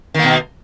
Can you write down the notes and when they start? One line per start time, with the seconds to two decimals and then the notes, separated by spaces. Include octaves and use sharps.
0.14 D#3
0.19 A#3
0.24 B2